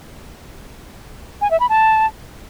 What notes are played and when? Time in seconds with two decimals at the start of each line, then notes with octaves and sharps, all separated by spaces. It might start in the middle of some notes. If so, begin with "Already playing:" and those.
1.41 G#5
1.51 E5
1.60 B5
1.69 A5